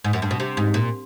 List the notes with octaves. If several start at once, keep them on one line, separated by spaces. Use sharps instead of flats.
G#2
F#2
G2
B2
C3
G#2
A#2